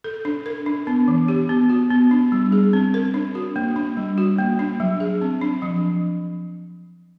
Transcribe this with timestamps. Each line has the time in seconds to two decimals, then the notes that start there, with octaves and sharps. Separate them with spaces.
0.04 A4
0.25 D4
0.46 A#4
0.66 D4
0.87 B3
1.08 E3
1.28 G4
1.49 B3
1.69 F#4
1.90 B3
2.11 D4
2.32 G3
2.52 G#4
2.73 C4
2.94 A#4
3.14 D4
3.35 F#4
3.56 A#3
3.76 D4
3.97 G3
4.18 F#4
4.38 A#3
4.59 D4
4.80 F#3
5.00 G#4
5.21 C4
5.41 D4
5.62 F3